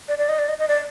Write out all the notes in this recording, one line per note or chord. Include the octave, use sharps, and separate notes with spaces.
D5
D5
D#5
D5
D#5
D#5
D5